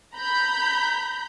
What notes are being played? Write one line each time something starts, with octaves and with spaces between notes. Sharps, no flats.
A#5 B5 G6